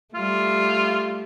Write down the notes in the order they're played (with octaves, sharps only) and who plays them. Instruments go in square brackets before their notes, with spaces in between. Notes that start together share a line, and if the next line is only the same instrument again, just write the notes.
[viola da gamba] G3 A3 [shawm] F4